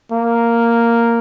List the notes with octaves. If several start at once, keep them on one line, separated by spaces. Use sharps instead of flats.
A#3